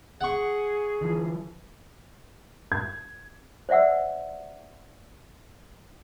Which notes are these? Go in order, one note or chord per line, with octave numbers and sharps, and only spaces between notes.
G#4 F#5 C#6
D3 E3 F3
G#6
C5 D5 E5 F#5 E6